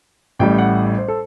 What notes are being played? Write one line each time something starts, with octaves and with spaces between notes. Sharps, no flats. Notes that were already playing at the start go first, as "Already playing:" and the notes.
A1 A2 G3 G5
F#5
C5
A4